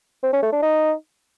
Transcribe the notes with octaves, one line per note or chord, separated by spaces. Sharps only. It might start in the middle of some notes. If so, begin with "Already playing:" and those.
C4
C#4
A3
D4
D#4